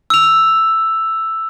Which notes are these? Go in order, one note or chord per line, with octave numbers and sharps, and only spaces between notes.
E6 F7